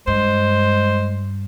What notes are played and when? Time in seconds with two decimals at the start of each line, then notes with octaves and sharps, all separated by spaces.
0.07 G2 G#3 C5